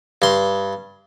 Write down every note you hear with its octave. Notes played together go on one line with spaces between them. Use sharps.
G2 C6